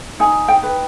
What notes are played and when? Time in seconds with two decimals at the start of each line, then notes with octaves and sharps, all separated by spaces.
0.20 D#4 G#5
0.48 G5
0.63 B4